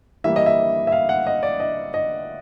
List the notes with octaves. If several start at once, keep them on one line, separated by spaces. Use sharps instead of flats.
E3 G3 A#3 E5
D#5
E5
E5
F5
F#5
D#5
D5
D#5
D#5